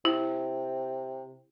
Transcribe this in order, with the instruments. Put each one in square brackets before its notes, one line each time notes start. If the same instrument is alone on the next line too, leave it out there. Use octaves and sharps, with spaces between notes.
[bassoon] C3 [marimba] E4